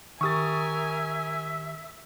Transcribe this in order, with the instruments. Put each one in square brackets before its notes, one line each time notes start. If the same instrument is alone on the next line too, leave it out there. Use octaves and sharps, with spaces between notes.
[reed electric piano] D#3 G4 [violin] A#4 G#5 [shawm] E5 [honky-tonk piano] C#6 D#6 A6